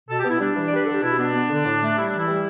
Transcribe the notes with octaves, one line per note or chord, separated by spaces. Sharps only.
B2 A4
B3 G4
E4
G3 D4
E3
D5
G3 B4
D3 A4
G4
B2 E4
B3 D4
B3
D3
A2
A3
G3 E4
E3 D4
E4
G3